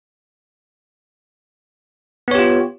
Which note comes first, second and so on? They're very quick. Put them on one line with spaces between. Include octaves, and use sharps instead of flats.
B3 C#5 G4 F4